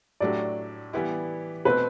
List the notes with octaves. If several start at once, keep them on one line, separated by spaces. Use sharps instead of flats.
A2 F#3 A3 D4 G4 D5
E3 G3 B3 E4 G4
B2 A3 C4 B4